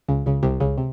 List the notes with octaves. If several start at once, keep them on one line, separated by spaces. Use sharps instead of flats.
C#2 C#3
C#2 C#3
C2 C3
C#2 C#3
C3